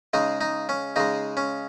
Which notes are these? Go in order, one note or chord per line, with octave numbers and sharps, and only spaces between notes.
C#3 G#3 D#4
D#4
C#4
C#3 G#3 D#4
C#4